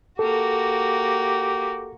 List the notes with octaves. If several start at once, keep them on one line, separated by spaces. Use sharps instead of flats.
A#3 F#4 G4 A4